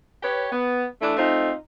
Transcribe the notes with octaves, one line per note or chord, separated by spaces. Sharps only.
G4 B4 C#5
B3
E3 A3 D4
A3 C4 D#4 F4